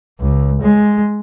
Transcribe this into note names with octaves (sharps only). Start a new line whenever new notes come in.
C#2
G#3